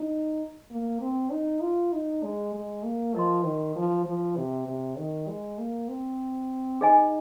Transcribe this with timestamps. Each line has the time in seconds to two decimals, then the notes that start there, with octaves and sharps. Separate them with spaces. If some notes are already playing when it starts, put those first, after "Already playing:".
Already playing: D#4
0.71 A#3
1.00 C4
1.31 D#4
1.62 F4
1.93 D#4
2.23 G#3
2.54 G#3
2.83 A#3
3.14 F3 A#4 D#5 C6
3.44 D#3
3.76 F3
4.06 F3
4.37 C3
4.67 C3
4.97 D#3
5.28 G#3
5.58 A#3
5.89 C4
6.81 D#4 G#4 D#5 G#5